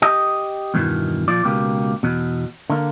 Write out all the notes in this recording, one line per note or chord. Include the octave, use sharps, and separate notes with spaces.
G4 D#5
E2 G2 B2 D#3 E3
A#2 F3 D5
C#2 B2 A#3 G4
E2 B2
D3 A#3